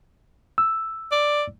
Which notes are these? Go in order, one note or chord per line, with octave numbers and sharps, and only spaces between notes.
E6
D5